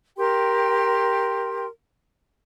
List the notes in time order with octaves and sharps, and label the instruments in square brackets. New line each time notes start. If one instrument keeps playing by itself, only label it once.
[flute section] G4 A#4 G5 C6